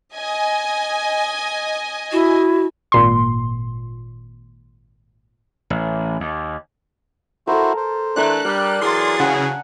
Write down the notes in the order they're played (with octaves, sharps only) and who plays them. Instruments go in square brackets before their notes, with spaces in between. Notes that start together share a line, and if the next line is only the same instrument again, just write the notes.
[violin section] D#5 G#5
[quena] E4 [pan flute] F#4
[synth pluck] G#1 A#2 C6
[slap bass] A1
D#2
[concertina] E4 F#4 C5 [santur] A4 A#4
[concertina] C5
[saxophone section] E3 A3 [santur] D4 A#4 [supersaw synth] F#6
[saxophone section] G3 [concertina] A#4 D5 [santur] A5
[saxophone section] E3 F#3 G#4 [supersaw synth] C6 A6
[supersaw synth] C#3 [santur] F#5 G#5